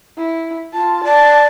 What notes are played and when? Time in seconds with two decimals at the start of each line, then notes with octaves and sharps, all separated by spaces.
0.18 E4
0.73 F4 A5
1.04 D5 A5